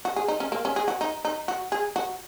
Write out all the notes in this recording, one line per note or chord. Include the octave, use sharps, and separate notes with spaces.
F#4
G#4
D#4
C#4
A#3
C#4
G#4
F#4
D#4
D#4
F#4
G#4
F#4